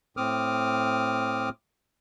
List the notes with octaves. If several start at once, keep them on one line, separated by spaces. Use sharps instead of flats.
A2 C4 D6 D#6 F6